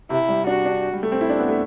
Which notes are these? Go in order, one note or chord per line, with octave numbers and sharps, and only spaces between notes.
C3 E4
G3
D4 F#4
D4
G3
A3
C4
E4
D4
B3
A3